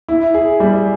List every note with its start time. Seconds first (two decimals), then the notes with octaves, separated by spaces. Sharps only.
0.08 E4
0.34 G#4
0.60 G3